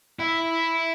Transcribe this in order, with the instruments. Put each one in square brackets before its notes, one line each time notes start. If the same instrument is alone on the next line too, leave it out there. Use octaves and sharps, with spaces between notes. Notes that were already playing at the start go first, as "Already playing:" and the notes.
[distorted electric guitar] E4 E5